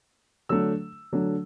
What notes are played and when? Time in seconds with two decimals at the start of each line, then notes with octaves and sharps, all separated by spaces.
0.49 D3 F#3 A3 D4 E6
1.12 D3 F#3 A3 D4